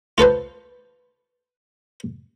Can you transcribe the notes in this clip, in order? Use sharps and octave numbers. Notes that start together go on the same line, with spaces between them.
F4 A4 B4 C5